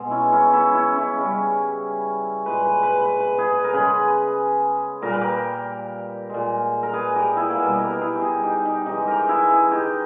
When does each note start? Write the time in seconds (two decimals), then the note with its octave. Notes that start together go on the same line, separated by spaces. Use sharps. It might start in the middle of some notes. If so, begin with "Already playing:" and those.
Already playing: B2 G#3
0.10 C#4 E4
0.32 C#4 E4
0.53 C#4 E4
0.74 C#4 E4
0.96 C#4 E4
1.17 C#3 G3
2.46 A#2 G#3 B4
2.65 B4
2.83 B4
3.01 B4
3.20 B4
3.38 G#4 B4
3.64 A#4
3.73 C#3 G#3 G#4 B4
5.02 A#2 G3 A#4
5.12 B4
5.21 G4 A#4
6.29 A#2 G#3
6.83 A#4
6.93 G#4 B4
7.15 G4 A#4
7.37 E4 G#4
7.50 A#3
7.57 B2 G3 B3
7.79 G4 A#4
7.92 A#4
8.01 E4 G#4
8.15 G4
8.22 E4 G#4
8.43 D#4 G4
8.65 D#4 G4
8.86 C#3 E3 G#3 D#4 G4
9.07 G4 A#4
9.29 E4 G#4
9.50 E4 G#4
9.71 D#4 G4